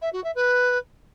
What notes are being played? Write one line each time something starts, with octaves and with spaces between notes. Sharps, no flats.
E5
F#4
E5
B4